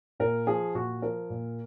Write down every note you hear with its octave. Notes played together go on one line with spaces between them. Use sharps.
A#2 A#4
F3 G#4
A#2 F#4
F3 A#4
A#2